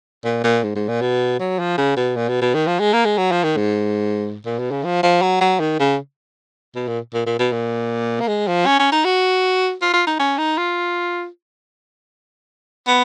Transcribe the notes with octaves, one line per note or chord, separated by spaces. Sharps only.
A#2
A#2
G#2
G#2
A#2
B2
F#3
F3
C#3
B2
A#2
B2
B2
D#3
F3
G#3
A#3
G#3
F#3
F3
D#3
G#2
A#2
B2
C#3
F3
F3
F#3
F#3
D#3
C#3
B2
A#2
A#2
A#2
B2
A#2
A#3
G#3
F3
C#4
C#4
D#4
F#4
F4
F4
D#4
C#4
D#4
F4
B3